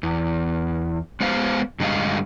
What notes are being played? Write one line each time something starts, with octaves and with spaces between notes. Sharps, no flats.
E2
G#3 B3 C5 F5
G2 D3 G3 G#3 D#5 F5